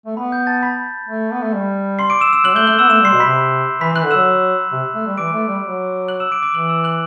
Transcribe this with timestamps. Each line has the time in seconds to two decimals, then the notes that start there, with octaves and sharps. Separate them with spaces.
0.06 A3
0.17 B3 B5
0.32 G6
0.47 A5 A6
0.63 B5 B6
1.08 A3
1.32 B3
1.42 A3
1.53 G3
1.99 C6 C7
2.10 D6 D7
2.21 E6 E7
2.33 E6 E7
2.44 F#3 F#6 F#7
2.55 A3 G6 G7
2.67 A3 F#6 F#7
2.79 B3 E6 E7
2.90 A3 E6 E7
3.01 G3
3.05 C6 C7
3.13 B2
3.20 C3 B5 B6
3.81 E3 B5 B6
3.93 E3 F#6 F#7
4.04 D3
4.11 F#3 E6 E7
4.72 C3
4.95 A3
5.06 G3
5.18 E3 D6 D7
5.33 A3
5.48 G3
5.64 F#3
6.08 F#6 F#7
6.20 E6 E7
6.31 D6 D7
6.42 D6 D7
6.54 E3 F#6 F#7
6.69 E6 E7
6.84 F#6 F#7